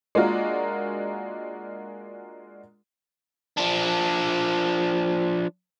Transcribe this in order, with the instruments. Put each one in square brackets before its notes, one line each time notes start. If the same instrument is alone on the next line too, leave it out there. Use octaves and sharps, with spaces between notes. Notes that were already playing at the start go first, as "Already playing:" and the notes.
[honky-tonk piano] G#3 A#3 D4 F4 F#4 A#4
[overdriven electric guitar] F3 D4